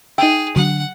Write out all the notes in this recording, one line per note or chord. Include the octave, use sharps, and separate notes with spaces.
D#4 G#4 E5 G5
D3 F#3 D4 F#5